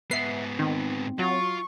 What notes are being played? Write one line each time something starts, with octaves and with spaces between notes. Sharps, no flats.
G#2 B3 B4 E5 F#5 C7
D#3 C4
F#3 F4 C#6